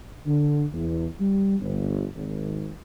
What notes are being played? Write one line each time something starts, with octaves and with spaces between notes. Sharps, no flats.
D3
E2
G3
G1
G#1